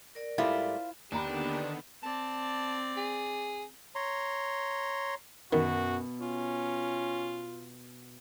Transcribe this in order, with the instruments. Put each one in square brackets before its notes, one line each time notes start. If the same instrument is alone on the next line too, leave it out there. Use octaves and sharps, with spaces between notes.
[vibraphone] A#4 D5
[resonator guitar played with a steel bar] G#2 G3 A3 [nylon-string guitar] E4 [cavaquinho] F4 C5
[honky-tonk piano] D#2 A#5 B5 [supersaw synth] D3 D#3 B3 [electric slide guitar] D4 [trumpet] G4
[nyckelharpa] C4 D5 [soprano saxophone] A5
[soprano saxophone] G#4
[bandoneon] C#5 A#5 C6
[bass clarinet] F#2 [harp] B2 [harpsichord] D#3 [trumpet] F#4
[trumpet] C#4 [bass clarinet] F4